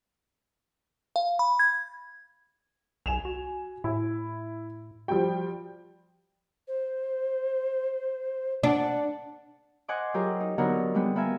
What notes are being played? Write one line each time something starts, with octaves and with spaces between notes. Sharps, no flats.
F5
B5
G#6
B1 G#5 E7 F7
F#4
A2 E4
F3 G3 F#4 G5
C5
D4 F#5
C5 D#5 F#5 G#5 C6 D6
F#3 F4 G4 G#4 A#4
D#4
D3 F#3 B3 D#4 F#4 A#4
G3 G#3 B3 C4
B3 A#4 E5 F5 G#5